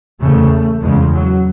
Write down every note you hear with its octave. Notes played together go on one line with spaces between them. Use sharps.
E2 C#3 A3
E2 C#3 G#3
F#3